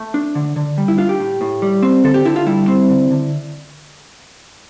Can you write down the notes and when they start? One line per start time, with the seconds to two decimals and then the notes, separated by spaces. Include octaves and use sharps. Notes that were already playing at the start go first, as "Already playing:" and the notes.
Already playing: A3
0.14 D4
0.35 D3
0.56 D3
0.78 G3
0.88 E4
0.98 D4 F4
1.09 G4
1.19 A2
1.41 A2
1.62 G3
1.83 C4
2.04 D3 A4
2.14 G4
2.25 D3 E4
2.36 F4
2.46 G3 E4
2.68 C4
2.89 D3
3.10 D3